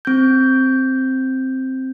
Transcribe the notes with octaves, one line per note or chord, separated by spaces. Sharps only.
C4 G6